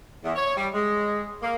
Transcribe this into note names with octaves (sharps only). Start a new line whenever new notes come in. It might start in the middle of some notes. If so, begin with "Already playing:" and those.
E2
C#5
G3
G#3
A#3